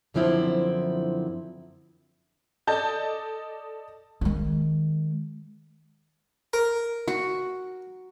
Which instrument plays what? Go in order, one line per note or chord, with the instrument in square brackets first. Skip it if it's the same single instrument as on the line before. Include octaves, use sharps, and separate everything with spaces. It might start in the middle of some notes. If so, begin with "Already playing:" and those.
[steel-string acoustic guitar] F#2 D3 F3 C4 E4
[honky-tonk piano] A4 D5 D#5 A5 G6
[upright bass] D#3 G#3
[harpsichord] A#4
[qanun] F#4